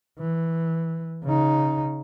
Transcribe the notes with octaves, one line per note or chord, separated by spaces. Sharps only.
E3
C#3 D#4